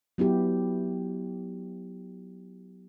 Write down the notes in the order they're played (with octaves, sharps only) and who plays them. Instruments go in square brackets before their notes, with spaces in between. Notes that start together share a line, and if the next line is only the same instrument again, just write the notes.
[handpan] F#3 B3 E4 G4